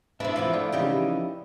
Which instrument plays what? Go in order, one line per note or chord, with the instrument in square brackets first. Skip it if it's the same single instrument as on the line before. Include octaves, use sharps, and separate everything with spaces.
[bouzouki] B3 E4 [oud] D4 [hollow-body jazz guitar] C5 E5
[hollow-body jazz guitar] C3 E3 [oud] F3 D4 F4
[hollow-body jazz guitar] A3 [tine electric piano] D5 F5
[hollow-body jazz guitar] F2 C#3 E3 [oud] D#4 G4 C#5